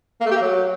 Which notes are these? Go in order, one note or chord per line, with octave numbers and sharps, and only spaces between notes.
A#3
A3
G4
A#3
F#3